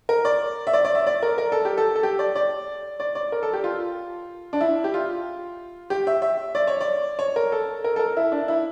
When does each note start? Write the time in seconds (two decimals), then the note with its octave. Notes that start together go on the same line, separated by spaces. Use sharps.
0.09 A#4
0.25 D5
0.67 E5
0.73 D5
0.85 D5
0.95 E5
1.07 D5
1.23 A#4
1.38 A#4
1.52 A4
1.65 G4
1.77 A4
1.96 A4
2.03 G4
2.19 D5
2.35 D5
3.00 D5
3.15 D5
3.32 A#4
3.43 A4
3.53 G4
3.64 F4
4.53 D4
4.61 E4
4.84 G4
4.94 F4
5.90 G4
6.07 E5
6.22 E5
6.55 D5
6.67 C#5
6.81 D5
7.19 C#5
7.36 A#4
7.52 A4
7.84 A#4
7.96 A4
7.99 A#4
8.17 E4
8.32 D4
8.48 E4